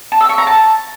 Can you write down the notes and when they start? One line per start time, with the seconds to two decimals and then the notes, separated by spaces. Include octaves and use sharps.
0.12 A5
0.21 E6
0.29 C#6
0.38 A#5
0.47 A5